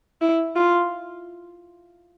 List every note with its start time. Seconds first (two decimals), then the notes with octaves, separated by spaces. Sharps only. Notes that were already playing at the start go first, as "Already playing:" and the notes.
0.22 E4
0.56 F4